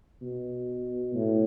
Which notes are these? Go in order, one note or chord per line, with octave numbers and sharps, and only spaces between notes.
B2
A2